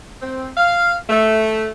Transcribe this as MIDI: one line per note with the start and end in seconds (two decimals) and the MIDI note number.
0.21 0.49 60
0.57 0.94 77
1.09 1.67 57